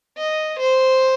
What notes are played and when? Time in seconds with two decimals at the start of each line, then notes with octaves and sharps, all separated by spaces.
0.18 D#5
0.59 C5